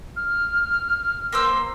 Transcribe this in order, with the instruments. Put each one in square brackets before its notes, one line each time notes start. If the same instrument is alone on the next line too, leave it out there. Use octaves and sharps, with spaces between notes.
[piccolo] F6
[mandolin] A#3 C5 E6